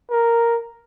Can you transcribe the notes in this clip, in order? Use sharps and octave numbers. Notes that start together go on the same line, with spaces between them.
A#4